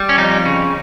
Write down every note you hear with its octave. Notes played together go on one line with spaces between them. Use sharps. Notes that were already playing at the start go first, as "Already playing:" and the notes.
Already playing: G3
C#4
F2 D#4
C#3